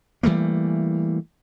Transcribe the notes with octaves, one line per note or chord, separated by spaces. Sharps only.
E3 G3 A3 A#3